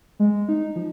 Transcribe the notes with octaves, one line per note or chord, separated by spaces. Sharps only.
G#3
D#4
F3